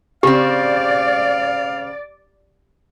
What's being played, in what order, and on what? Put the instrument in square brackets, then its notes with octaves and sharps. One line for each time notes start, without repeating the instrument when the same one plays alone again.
[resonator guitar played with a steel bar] C#3 C4 [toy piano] G4 [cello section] D5 [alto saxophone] F5